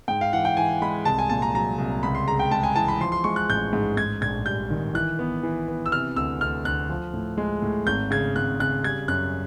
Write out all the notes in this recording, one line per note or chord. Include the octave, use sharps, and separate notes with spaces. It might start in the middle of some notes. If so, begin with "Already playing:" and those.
G#2 G5
F5
E3 F#5
G5
E3 G#5
G#3 B5
C2 A5
G#5
A#2 A5
A#5
F#3 A#5
C2
C#2 B5
C6
C#3 A#5
G5
G#3 A5
G#5
E3 A5
B5
F3 C6
C6
G#3 C#6
F#6
A1 G6
G#2
G#2 G#6
A#1 G#6
G3 G6
D#3
E3 F#6
B3
E3
B3
E6
C3 F6
D2 E6
D2 F6
D2 F#6
F3
A2
G#3
A2
G#1 G6
C#3 G#6
G#1 F#6
C#3 F#6
G3 G#6
F#2 F#6